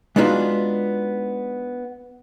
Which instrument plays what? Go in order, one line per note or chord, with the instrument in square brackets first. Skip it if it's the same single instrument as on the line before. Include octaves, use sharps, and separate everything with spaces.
[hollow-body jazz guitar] G#3 B3 D4 D#4 F4 F#4